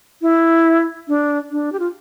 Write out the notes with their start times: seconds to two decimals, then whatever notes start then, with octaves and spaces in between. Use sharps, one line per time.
0.22 E4
1.08 D4
1.51 D4
1.72 G4
1.80 F4